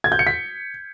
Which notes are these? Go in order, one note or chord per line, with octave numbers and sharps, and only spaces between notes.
G#6
G6
C#7
B6